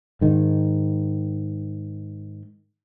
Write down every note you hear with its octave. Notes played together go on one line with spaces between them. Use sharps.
G#2 D#3